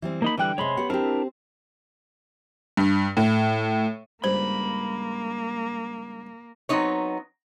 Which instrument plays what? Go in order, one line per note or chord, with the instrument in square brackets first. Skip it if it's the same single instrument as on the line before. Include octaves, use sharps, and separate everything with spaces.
[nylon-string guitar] E3 G3 C4
[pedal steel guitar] A#3 D#4 B5
[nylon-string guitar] D3 G5 [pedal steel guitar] E3 G3 F#6
[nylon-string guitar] C3 G#3 [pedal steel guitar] C#5 B5 C6
[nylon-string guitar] B3 G4 F#5
[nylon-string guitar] C4 G4 [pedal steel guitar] D4 E4 A#4
[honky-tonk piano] G2
A2
[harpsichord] C#2 G2 [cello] A#3 [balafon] C5 [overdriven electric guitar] B5
[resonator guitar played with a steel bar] F#3 B3 C4 D#4 C#5